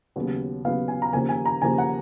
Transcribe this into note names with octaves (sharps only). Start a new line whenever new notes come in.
D#2 C#3 F#3 B3
D#2 C#3 F#3 B3 F5
G#5
A#5
D#2 C#3 F3 A#3 G#5
G#5
A#5
D#2 C#3 F3 A#3 G#5
F#5